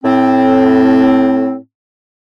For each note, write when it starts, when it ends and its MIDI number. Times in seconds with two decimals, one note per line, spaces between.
0.04 1.56 45
0.04 1.56 60